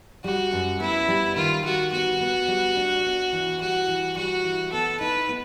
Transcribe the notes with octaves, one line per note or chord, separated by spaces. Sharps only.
G3 F#4
F#2
B3 E4
G3
D#3 F4
G3 F#4
B3 F#4
B3
G3
D4
B3
E3
G3 F#4
E3
G3 F#4
E3
B3 A4
D#4 B4
B3